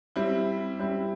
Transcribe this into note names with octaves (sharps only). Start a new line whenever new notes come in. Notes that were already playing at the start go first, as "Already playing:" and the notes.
G3 C4 E4
G3 C4 E4